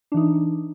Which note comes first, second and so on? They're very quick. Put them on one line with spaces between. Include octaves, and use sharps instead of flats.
D4 E3 D#4